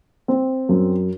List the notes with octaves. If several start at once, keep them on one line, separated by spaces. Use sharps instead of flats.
C4
F#2